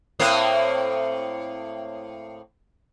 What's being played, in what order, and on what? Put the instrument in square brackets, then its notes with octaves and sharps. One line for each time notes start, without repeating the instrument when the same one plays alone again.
[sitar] A2 A#3 C4